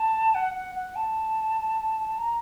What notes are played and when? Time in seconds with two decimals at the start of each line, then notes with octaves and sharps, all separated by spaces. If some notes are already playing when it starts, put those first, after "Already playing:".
Already playing: A5
0.35 F#5
0.55 F#5
0.75 F#5
0.96 A5
2.18 A#5